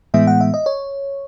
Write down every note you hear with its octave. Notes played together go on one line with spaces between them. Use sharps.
A2 E3 G#3 B3 E5
F#5
E5
D#5
C#5